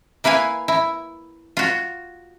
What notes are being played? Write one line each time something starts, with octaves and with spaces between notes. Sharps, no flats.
A#3 E4 B4 F5 G#5
E4
F4 F#4